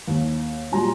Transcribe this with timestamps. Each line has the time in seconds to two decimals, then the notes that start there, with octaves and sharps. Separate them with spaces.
0.08 D#2
0.71 A#2 F#3 G3 G#5 A#5 C6